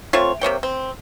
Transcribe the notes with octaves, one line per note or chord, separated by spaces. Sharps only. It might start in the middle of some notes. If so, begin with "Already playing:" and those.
A3 C4 F4 C#5
C3 A#3 C#5 G5
C4